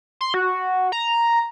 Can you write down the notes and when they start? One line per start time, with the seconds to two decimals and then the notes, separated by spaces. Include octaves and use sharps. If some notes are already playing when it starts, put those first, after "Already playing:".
0.21 C6
0.34 F#4
0.92 A#5